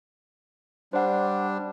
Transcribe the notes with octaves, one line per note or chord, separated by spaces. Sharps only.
G3 D4 C5 F#5